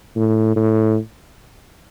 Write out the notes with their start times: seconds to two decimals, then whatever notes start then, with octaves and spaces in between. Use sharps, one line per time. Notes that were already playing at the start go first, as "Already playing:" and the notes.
0.16 A2
0.56 A2